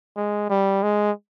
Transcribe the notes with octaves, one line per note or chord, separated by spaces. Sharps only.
G#3
G3
G#3